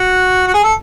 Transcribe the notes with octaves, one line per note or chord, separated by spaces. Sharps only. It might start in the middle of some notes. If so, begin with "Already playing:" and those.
Already playing: F#4
F#4
G#4
A4